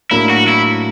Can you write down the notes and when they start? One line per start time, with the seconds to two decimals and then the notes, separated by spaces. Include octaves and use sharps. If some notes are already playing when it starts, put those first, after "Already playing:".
0.11 A2 F#3 A#3 D4 E4
0.30 F#4
0.48 E4